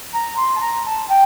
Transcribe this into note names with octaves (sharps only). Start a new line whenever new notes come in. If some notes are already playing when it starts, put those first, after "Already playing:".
A#5
C6
A5
A#5
A5
G5